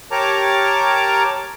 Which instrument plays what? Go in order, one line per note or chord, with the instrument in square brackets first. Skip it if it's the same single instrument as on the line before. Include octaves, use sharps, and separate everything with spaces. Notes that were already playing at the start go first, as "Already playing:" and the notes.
[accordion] G4 A#4 C#5 A5 A#5 D6